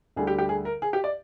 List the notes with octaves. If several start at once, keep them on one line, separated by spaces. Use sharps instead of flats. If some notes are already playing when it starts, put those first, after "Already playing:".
D2 D3 G3 G#4
G4
G4
G#4
A#4
G#4
G4
D5